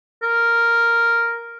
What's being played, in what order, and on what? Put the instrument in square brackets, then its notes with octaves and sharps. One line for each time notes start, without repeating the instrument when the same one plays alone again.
[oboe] A#4